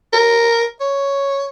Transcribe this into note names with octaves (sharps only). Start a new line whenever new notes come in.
A#4
C#5